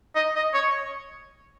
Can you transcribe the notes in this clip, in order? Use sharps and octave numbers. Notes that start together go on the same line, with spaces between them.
D#5
D#5
C#5